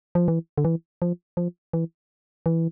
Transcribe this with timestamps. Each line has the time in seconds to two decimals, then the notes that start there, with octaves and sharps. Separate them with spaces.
0.15 F3
0.28 E3
0.58 D3
0.65 E3
1.02 F3
1.37 F3
1.73 E3
2.46 E3